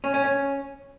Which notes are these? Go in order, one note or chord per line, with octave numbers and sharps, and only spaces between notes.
C#4
C#4
C#4